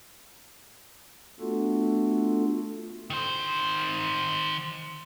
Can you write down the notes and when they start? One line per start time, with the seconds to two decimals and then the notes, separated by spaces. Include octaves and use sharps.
1.40 A3 B3 D4 F4 F#4 A4
3.10 D#3 C5